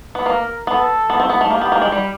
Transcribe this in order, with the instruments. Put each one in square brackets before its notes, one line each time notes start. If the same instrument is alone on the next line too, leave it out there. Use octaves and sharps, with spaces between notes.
[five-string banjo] B3
[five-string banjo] A#3 [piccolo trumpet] A#4
[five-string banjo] B3 [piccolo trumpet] A4
[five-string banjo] B3
C4
B3
A3
[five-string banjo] A#3 [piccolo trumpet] G4
[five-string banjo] B3
A#3
G#3
G3